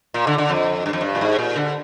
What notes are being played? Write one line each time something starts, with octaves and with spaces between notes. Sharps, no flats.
A#2
D3
D3
F2
G2
F2
G2
A#2
G#2
A#2
D3